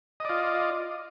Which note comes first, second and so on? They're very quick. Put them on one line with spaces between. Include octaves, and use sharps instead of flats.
D#5 D5 F4